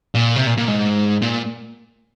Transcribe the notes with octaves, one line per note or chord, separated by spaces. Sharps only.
A#2
C3
A#2
A#2
G#2
A#2